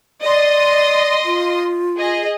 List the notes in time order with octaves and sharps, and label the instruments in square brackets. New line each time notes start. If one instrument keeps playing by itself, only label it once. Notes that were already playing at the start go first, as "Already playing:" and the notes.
[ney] D5 [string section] D#5 C6
[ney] F4
[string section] G#4 D#5